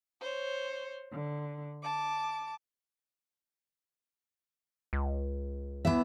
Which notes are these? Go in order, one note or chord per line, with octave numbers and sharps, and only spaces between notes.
C5 C#5
D3
A5 D6
C#2
E3 B3 E5